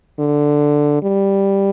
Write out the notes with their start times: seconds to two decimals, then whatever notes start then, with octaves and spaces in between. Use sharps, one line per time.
0.19 D3
1.02 G3